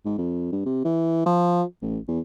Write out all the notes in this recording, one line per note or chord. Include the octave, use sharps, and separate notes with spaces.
G#2
F2
G2
C3
E3
F3
A1
E2